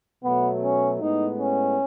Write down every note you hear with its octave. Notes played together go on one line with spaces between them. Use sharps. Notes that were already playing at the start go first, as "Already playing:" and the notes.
B2 F#3 A3 B3
C#4
A2 G#3 B3 D#4
C#4